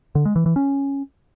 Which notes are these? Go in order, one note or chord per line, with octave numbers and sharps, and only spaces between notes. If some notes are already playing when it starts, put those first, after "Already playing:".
D3
G#3
E3
E3
C#4